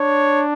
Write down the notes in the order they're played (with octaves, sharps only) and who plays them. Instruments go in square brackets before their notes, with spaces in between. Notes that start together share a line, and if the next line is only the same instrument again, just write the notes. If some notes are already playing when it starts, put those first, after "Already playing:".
Already playing: [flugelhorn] D4 [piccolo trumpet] C#5